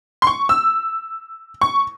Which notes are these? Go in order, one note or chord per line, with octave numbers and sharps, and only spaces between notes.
C6
C#6
E6
C#6